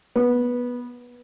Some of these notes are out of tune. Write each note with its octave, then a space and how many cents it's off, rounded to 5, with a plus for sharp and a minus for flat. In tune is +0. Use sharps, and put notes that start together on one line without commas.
B3 -15